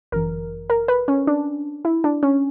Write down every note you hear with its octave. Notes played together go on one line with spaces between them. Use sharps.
G1 F#2 E3 A#4
A#4
B4
C#4
D4
E4
D4
C#4